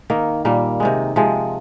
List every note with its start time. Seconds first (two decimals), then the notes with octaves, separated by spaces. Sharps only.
0.10 D#3 A#3
0.45 A#2 G3 A#3
0.80 C3 D#3 G#3
1.16 C3 F3 G#3